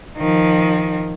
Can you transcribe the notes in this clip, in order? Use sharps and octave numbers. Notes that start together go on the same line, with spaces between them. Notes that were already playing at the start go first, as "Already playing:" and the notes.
D#3 F3